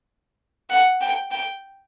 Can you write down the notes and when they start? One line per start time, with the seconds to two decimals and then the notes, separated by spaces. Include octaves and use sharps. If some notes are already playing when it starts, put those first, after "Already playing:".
0.70 F#5
1.01 G5
1.31 G5